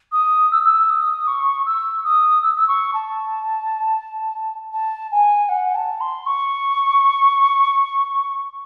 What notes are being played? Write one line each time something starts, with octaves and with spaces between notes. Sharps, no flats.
D#6
E6
E6
D#6
C#6
E6
D#6
E6
E6
C#6
A5
A5
G#5
F#5
A5
C6
C#6